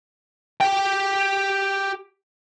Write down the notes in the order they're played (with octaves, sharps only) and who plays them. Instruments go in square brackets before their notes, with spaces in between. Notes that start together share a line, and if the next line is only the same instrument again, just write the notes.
[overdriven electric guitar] G4 G5